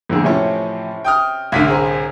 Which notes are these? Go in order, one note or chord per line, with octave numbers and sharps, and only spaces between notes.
F2 A2 D3 A#3 G#4
A2 C3 E3 F3 C#4 C#5
G5 D#6 F6
C2 A2 D3 G#6 B6 D#7
G#4 A#4 C5